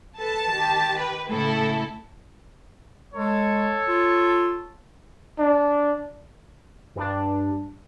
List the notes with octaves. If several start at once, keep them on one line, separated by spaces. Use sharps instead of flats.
A4 B4 A5
D#3 G4
B4
A2 C#3 E4 A4
G#3 A4 C#5
F4
D4
G2 D4